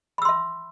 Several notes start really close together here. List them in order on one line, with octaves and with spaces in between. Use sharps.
B5 E6 C6 E5